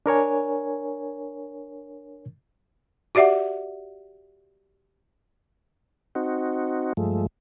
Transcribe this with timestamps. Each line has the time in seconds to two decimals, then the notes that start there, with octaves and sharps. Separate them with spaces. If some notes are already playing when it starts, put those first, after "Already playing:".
0.06 D4 A#4 C#5 G#5
3.15 F#4 G4 D5 E5 F#5
6.15 C4 D#4 F#4
6.97 G2 F3 G#3 A3